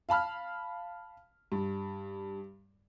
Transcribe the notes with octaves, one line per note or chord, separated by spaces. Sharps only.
F5 A5 B5 F6
G2